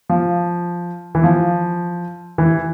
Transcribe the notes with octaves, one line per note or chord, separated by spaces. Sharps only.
F3
E3
F3
E3